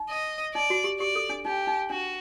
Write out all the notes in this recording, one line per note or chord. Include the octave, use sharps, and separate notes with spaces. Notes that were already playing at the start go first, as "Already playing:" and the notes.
Already playing: D#4
D#5
D#4 D5
F#4
G4
G4 D5
A4
D4
D#4 G4
D#4
D4 F#4